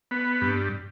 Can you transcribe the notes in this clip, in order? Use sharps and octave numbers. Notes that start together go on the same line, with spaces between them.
B3
G2